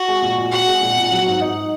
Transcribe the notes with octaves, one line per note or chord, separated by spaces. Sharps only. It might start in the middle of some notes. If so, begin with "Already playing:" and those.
Already playing: F#4
G#3
A#2
A#2
F#4 F#5
G#3
A#2
A#2
F#3
G#2
D#4